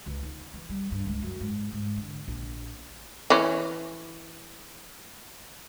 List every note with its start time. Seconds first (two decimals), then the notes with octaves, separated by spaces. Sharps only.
0.06 C#2
0.23 D#4
0.54 E3
0.70 G3
0.92 G2
1.06 C#2
1.22 F#2
1.41 G#2
1.72 G#2
1.96 D3
2.28 A#1
3.30 E3 C#4